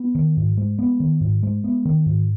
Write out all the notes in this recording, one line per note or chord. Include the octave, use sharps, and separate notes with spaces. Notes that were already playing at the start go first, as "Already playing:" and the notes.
Already playing: B3
D#3
G#2
G#3
B3
D#3
G#2
G#3
B3
D#3
G#2